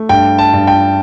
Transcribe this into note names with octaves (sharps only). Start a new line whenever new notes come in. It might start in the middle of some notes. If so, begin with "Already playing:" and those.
Already playing: A3
G2 G5
A5
G2
G5